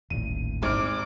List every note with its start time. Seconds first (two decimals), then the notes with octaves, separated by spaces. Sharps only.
0.10 D#1 A1 D#7
0.63 G#1 D6 F6